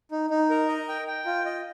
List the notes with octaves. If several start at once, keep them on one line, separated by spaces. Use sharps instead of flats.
D#4
D#4
A#4
D#5
G5
G5
F4
D#5